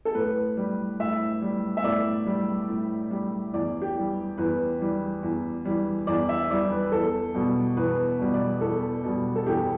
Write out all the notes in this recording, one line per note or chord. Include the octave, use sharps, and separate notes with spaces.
A4
A2 B4
G3
A2 E5
G3
E5
A2 D5
G3
A2
G3
E2 D5
G4
E3 G3
E2 B4
E3 G3
E2
E3 G3
E2 D5
E5
E3 G3 D5
B4
E2 A4
B2 G3
E2 B4
B2 G3
D5
E2 A4
B2 G3
A4
E2 G4